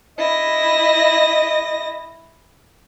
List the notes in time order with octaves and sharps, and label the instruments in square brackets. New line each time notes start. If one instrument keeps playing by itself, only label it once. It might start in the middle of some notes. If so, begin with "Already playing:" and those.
[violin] E4 A#6 [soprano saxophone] D#5